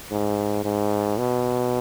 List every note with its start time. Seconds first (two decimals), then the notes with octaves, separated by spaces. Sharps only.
0.11 G#2
0.64 G#2
1.18 B2